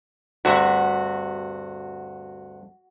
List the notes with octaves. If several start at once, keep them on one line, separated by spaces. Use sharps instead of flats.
D2 G2 C3 F#4